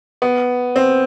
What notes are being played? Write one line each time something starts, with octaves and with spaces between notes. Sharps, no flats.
B3
C4